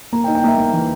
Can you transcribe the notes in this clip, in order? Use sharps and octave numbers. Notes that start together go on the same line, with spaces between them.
A#3 A#5
G5
D#4
G5
A#3 E5
A#3
E3